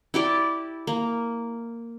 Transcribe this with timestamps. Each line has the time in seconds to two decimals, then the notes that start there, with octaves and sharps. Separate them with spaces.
0.14 E4 G4 D5
0.87 A#3